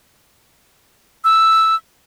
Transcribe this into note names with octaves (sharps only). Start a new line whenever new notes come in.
E6